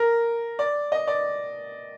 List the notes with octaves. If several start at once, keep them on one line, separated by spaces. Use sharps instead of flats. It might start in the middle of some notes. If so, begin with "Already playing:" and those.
Already playing: A#4
D5
D#5
D5